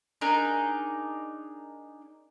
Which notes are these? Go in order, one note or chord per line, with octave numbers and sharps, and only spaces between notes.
D4 D#4 G#4 A#4